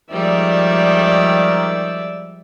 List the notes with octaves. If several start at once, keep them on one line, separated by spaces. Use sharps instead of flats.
D#3 F3 G3 G#3 D5 E5